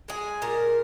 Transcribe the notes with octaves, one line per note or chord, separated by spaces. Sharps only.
G#3 G#4
A#2 A#4